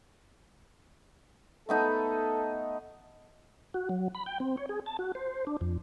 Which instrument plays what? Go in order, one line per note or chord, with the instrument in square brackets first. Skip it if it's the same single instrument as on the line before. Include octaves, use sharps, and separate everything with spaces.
[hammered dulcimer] A3 B3 D#4 [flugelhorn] A4
[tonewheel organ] F#4
F#3
B5
G5
C4
C#5
G#4
A5
F#4
C5
D4
F2